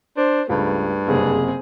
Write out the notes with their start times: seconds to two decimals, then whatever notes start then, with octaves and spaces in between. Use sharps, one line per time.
0.17 D4 C5
0.50 C#2 G2 A3
1.08 F#1 C3 C4 G#4